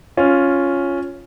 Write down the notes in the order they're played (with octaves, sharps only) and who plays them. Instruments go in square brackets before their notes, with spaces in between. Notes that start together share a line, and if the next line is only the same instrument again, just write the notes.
[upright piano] C#4 F4